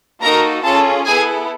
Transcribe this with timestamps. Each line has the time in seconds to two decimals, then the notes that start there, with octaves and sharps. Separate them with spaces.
0.21 A#3 D#4 F#4 A4 A#4 A#5
0.63 C#4 F4 G#4 A4 A5
1.05 B3 E4 G#4 A4 G#5